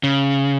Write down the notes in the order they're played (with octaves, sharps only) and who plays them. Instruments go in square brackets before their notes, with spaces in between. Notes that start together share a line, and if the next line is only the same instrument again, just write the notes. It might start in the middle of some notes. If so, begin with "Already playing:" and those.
[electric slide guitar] C#3